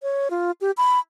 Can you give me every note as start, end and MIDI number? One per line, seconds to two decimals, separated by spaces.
0.03 0.28 73
0.30 0.51 65
0.61 0.71 67
0.77 0.99 83